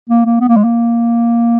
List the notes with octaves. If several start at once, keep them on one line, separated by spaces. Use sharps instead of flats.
A#3
A#3
B3
A#3
G#3
A#3